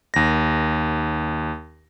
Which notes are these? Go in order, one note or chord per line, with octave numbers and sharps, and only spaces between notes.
D#2 A#6